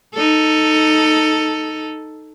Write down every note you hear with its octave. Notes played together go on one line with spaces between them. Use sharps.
D#4 A4